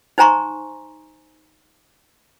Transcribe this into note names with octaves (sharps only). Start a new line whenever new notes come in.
D#4 C5 G#5 A#5 C6 C#6